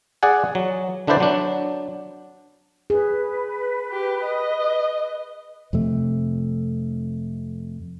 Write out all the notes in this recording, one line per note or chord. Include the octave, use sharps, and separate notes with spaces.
G#4 D5 F#5 G#5
F#3
D3 D4 E4 B4 C5 D5
F#3 D4
G#4 B4
G4
D#5
F2 C3 A3